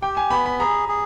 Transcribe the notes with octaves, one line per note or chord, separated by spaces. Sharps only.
G4 G5
G#5
B3 B5
B5
G#4 A#5
G#4